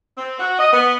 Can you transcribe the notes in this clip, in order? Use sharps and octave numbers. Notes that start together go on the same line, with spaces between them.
C4
F#4
D#5
B3